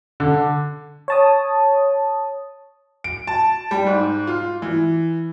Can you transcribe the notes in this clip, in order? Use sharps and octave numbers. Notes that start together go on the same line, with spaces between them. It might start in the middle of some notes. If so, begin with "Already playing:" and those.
D3
C#5 A5 D#6
D7
A5
G3
G#2
F4
E3